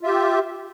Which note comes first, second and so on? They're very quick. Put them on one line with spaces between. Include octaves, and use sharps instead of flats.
F4 E5 G4